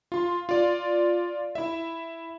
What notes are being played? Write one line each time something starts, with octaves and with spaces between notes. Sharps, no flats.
F4 C6
F4 D5
E4 E5